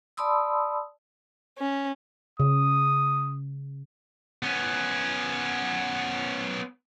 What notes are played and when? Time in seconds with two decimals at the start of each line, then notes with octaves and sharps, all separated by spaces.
0.17 D5 A5 B5 C6 D#6 E6
1.58 C#4
2.40 C#3 D#6
4.43 B3 C#4